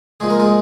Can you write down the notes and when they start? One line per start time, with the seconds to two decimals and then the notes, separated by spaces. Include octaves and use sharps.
0.20 A#2 F3 G#3 G#4
0.30 A#4
0.40 G#3 G#4